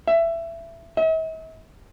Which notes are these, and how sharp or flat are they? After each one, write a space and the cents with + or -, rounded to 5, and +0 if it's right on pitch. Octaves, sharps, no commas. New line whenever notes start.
E5 +20
E5 -45